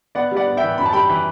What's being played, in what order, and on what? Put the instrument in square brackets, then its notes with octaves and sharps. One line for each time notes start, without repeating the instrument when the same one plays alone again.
[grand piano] B3 D5 F#5
G3
D5 F#5
B3
E5 G5
E3
F#2 B5
A5
G3 G5 B5
E3